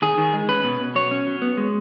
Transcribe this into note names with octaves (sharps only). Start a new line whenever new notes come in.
D#3 G#4
D#3
G#3
C#4 B4
B2
B2
F#3 C#5
C#4
F#3
B3
G#3